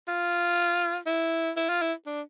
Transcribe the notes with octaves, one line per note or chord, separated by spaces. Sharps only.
F4
E4
E4
F4
E4
D4